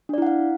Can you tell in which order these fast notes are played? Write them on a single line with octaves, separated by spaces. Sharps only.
D4 D5 E4 F#5 F5